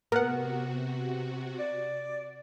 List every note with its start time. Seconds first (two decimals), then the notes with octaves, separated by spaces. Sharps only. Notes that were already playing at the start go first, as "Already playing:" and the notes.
0.12 C3 B3 F#4 A#4 F#5
1.59 D5